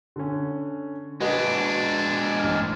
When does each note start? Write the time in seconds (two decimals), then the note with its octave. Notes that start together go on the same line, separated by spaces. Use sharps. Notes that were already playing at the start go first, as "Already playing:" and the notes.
0.16 D3 C#4
1.21 G#3 D4 F#4 B4 D#5
2.39 A1 F6